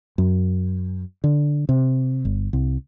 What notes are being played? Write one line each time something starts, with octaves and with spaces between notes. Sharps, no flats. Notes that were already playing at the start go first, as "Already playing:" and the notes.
F#2
D3
C3
G1
C2